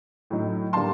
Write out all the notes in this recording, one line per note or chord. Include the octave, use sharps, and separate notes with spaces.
A2 F#3 A3 D#4
D3 G3 A#3 A5 C6